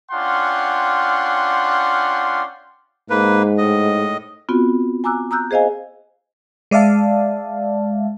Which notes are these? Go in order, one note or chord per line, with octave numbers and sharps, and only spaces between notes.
C#4 D4 F4 F#5 G5 C6
G#2 A#3 B4
A2 D#5
B3 C4 F4 F#4
G#5 A#5 D6 E6 F#6
A#5 D#6 E6 F#6 G6
G#4 C5 D#5 F5 G#5
G#3 D5 E5 F5 A5